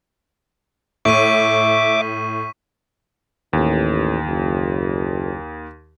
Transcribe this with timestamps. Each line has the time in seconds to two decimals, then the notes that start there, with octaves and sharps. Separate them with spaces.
1.05 A2 E5 C#6 D6 B6 D#7
3.53 A1 D#2
4.27 F#1